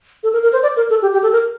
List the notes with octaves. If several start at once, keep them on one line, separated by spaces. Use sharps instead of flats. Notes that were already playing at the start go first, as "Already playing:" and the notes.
A4
A#4
A#4
C5
D5
A#4
A4
G4
G4
A4
A#4